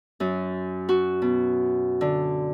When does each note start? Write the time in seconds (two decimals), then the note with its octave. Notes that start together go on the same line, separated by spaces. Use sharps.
0.20 F#2
0.89 F#4
1.22 B2
2.01 D3